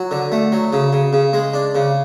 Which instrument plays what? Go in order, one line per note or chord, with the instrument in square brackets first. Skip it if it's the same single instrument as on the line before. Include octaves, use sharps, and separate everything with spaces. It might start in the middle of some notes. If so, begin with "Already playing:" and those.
Already playing: [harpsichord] F#3
D3
A3
F#3
C#3
C#3
C#3
G#3
D4
C#3